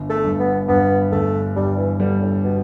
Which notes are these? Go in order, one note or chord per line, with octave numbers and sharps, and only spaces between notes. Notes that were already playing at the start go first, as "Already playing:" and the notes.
Already playing: G1
A3
G2
B3
G2 B3
G1 A3
G2 G3
E3
D3 G3
A2
B2